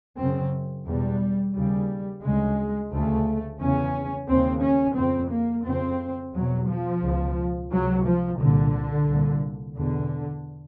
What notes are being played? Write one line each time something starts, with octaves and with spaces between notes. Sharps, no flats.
F#2 C#3 C4
E2 B2 G3
D#2 C#3 G3
D2 C#3 G#3
D2 C#3 A3
E2 C#3 C#4
D#2 C#3 C4
C#4
F2 C#3 C4
A#3
F2 C#3 C4
E2 B2 F#3
F3
C#2 B2
C#2 C3 F#3
F3
C2 A#2 D3
C2 A#2
E2 B2 D3